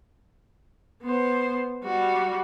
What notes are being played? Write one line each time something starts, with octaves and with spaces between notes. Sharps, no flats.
B3 C5
G3 F#4